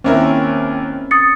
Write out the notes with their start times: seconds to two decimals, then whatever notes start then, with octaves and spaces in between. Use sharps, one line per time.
0.04 D#2 C4 C#4 E4 A#4
1.11 D#6 A6 C#7